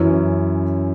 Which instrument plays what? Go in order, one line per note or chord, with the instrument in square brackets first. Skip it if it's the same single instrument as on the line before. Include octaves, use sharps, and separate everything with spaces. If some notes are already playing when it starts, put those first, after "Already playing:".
Already playing: [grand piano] F#2 E3 C#4 E4